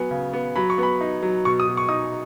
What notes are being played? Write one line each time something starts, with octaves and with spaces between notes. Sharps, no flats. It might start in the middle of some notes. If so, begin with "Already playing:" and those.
Already playing: F#3 B3 G#5
C#3
B3
F#3 B5
C#6
B3 B5
D#4
F#3
B2 C#6
D#6
B2
C#6
D#4 D#6